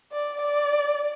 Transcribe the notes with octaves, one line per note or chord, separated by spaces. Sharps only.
D5
D5